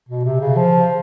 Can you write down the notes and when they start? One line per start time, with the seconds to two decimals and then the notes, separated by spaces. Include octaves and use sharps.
0.09 B2
0.24 C3
0.40 C#3
0.56 F3